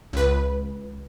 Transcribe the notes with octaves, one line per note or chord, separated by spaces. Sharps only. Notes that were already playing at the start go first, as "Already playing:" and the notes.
C#2 B4